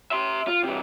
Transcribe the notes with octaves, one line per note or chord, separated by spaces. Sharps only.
E5 C6
F4
C3 E3